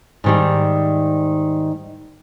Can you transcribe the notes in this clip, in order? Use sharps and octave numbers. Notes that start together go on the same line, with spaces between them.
G#2 D#3 G3